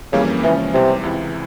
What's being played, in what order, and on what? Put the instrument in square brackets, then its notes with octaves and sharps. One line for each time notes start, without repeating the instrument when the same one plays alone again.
[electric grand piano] F2 E3 G3 A#3 C#4 [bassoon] C#3
[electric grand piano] C#3 F3 G#3 C#4 [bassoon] E3
[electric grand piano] E2 E3 G3 [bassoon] C3
[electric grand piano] C#2 C3 E3 G#3 E4